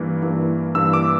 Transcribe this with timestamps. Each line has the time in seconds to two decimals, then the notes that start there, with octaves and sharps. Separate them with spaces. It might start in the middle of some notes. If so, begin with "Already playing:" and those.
Already playing: G2 E3 A#3
0.23 G2 E3 A#3
0.75 G2 E3 A#3 E6
0.93 D6